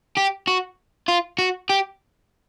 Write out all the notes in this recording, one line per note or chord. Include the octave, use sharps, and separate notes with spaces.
G4
F#4
F4
F#4
G4